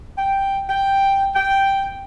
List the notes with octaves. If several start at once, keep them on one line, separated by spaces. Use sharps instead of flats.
G5
G5
G5